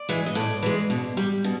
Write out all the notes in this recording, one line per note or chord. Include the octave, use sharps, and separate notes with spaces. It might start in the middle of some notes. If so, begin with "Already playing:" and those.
Already playing: D5
E3 G#3
D#5
A2 D5
E3 G#3
B2
G3
B2